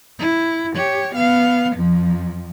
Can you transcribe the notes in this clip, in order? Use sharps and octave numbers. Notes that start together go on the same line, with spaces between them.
E4
G4 C#5
B3 F5
F2 F3